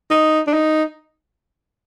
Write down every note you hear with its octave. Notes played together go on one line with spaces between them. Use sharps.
D#4
D4
D#4